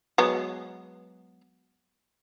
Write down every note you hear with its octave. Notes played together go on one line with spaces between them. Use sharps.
F#3 G#3 B3